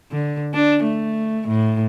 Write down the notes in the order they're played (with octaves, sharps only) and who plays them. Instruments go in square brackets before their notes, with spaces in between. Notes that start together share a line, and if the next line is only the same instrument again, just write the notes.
[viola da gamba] D3
D4
A3
A2